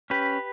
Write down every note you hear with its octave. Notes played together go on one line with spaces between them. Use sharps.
C#4 G4 B4